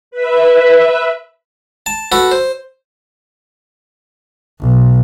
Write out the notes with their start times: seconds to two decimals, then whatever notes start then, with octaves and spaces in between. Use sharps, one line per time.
0.11 B4 E5
1.86 A5
2.12 F#4 A4 B4
2.31 C5
4.61 B1